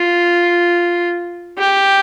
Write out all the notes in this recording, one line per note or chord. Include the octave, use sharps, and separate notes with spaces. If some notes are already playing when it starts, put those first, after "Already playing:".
Already playing: F4
G4